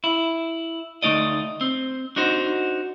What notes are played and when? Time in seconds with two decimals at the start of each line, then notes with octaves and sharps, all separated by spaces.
0.04 E4
1.03 D2 A3 D#4 D5 D#5
1.61 C4
2.16 D4 D#4 F#4 C5